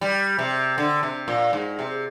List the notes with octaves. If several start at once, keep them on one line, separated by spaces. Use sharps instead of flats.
G3
C3
D3
C3
A#2
G#2
C3